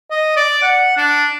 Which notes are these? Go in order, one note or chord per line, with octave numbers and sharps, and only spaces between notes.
D#5
D5
F#5
D4